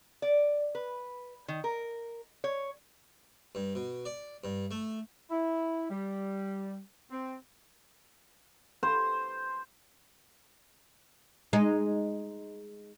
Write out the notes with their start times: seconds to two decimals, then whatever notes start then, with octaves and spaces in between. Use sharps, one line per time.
0.22 D5
0.75 B4
1.48 D#3
1.64 A#4
2.44 C#5
3.55 G2
3.75 B2
4.06 D5
4.44 G2
4.71 A3
5.30 E4
5.90 G3
7.11 C4
8.83 C5
11.53 G#3 D#4